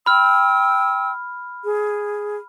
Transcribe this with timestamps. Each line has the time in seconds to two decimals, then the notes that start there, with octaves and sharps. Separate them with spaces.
0.06 G5 B5 E6 F6
1.65 G#4